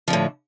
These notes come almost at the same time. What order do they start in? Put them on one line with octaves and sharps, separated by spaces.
F3 D3 A2